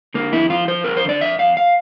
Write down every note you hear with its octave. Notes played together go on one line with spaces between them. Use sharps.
D3 A#3
F2 E4
F3 F4
F3 C5
F2 A#4
C5
D3 D5
F2 E5
F2 F5
F5